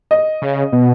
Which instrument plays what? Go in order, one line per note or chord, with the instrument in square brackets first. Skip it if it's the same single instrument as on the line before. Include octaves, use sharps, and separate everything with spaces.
[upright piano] D#5
[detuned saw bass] C#3
B2